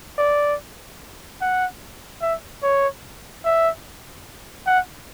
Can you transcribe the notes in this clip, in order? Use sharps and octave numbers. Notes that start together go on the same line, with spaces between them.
D5
F#5
E5
C#5
E5
F#5